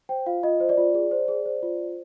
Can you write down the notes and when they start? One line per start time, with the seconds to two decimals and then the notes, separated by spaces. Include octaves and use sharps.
0.09 C5 G5
0.26 F4 F5
0.43 F4 D#5
0.60 C5
0.69 D5
0.78 F4
0.94 G#4
1.11 C5
1.28 G#4
1.46 C5
1.63 F4
1.79 C5